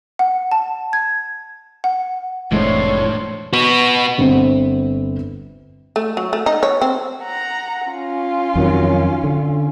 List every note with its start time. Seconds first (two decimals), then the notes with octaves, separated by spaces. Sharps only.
0.19 F#5
0.51 A5
0.93 G#6
1.84 F#5
2.52 F1 A2 E3 G#3 A3 D4 C5 C#5
3.53 B3 F#4
4.18 G1 C4
5.96 A3
6.17 F#3
6.33 A3
6.46 D#4
6.63 C#5
6.81 C4
7.23 F#5 A#5
7.89 C#4 F4
8.56 F2 D#3 F#3
9.24 D3